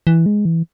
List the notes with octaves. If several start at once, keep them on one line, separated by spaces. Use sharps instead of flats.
E3
G#3
E3